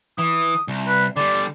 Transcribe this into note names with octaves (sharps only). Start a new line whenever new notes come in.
E3 D#6
C2
B4
D3 G3 D5